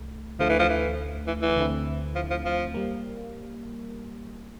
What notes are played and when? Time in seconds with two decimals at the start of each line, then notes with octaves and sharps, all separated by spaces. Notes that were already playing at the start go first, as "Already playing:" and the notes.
Already playing: C2 A3
0.39 D2 D3 F3 A3
0.49 E3
0.59 F3
0.69 E3
1.27 E3
1.42 E3
1.57 D2 D3 A3 C4 E4
2.15 F3
2.30 F3
2.45 F3
2.74 G3 A#3